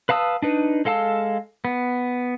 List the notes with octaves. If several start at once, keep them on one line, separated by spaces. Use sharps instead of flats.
B4 F5 A5 D#6 E6
D4 D#4 B4
G#3 A4 F5 A5 E6
B3